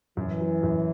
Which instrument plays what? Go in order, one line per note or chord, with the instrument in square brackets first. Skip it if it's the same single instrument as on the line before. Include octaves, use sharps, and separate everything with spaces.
[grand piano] F#2 [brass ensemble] E3
[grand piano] F#3
F#2